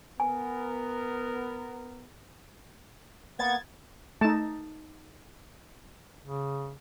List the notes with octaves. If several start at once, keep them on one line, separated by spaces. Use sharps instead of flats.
B3 A#4 G#5
A#3 B3 F#5 G#6 A6
A3 D#4 A5
C#3